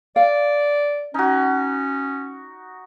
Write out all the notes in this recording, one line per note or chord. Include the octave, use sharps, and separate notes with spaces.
D5 F5
C#4 D#4 F#4